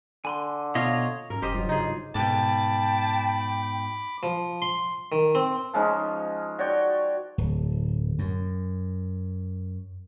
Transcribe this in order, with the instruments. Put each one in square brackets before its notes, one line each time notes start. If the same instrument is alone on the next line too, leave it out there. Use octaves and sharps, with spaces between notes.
[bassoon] D3 [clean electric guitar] G#5 B5 C6
[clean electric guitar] B2 [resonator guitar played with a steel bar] F4 [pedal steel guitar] C#5 D#5
[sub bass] G#2 [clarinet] C#4 [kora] A#4
[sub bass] F1 [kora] G4 C5 D#5
[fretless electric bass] G2 F#3 [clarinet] F4
[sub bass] C#3 [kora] D#4 G#4
[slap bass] G#2 B2 [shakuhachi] G5 [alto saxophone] A5 [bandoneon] B5 D6
[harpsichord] F3
C6
D#3
C4
[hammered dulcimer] F3 G#3 C#4 D#4
F#4 C#5 D5 G5
[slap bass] D1
F#2